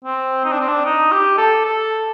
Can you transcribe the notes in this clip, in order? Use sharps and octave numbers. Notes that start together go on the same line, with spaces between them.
C4
D#4
D4
C4
D4
D#4
G4
A4
A4